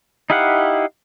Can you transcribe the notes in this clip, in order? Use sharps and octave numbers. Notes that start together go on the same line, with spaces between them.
D#4 E4 G4 F5 F#5